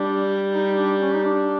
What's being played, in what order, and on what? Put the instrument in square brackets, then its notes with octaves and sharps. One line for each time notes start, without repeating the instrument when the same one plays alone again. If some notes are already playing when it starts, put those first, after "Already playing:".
Already playing: [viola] G3 [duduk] D4
[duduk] D#4
D4
C#4
D#4
D4